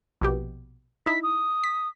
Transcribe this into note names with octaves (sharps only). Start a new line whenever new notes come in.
A#1 B2 G4
D#4 E4 B6
D#6
B6